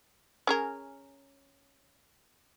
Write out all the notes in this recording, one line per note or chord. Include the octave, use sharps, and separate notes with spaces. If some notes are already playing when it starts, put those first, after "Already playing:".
C#4 G#4 A#4